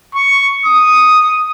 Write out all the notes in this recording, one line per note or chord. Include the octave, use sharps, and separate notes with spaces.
C#6
D#6